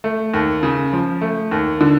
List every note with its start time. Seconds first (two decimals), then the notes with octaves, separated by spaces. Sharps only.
0.04 A3
0.34 D#2
0.63 C#3
0.93 F3
1.21 A3
1.51 D#2
1.81 D3